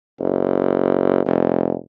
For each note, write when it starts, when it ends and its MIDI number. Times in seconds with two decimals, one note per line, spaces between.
0.20 1.24 30
1.26 1.74 29